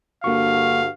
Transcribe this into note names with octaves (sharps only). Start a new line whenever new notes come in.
G2 D3 A#3 F#4 F5 C#6